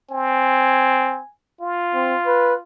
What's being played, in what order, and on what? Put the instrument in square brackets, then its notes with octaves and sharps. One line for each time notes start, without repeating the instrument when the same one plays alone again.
[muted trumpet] C4 [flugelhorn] G#5
[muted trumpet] F4
[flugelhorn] C4
B4